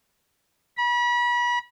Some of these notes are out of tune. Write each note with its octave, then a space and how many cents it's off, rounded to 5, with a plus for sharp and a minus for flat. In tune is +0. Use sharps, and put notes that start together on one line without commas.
B5 -35